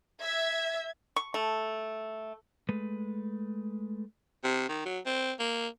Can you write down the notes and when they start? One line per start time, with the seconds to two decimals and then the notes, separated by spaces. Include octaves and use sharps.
0.22 E5 G#6
1.16 C#6
1.34 A3
2.69 G#3 A3 B4
4.44 C3
4.69 D#3
4.85 F#3
5.06 C4
5.39 A#3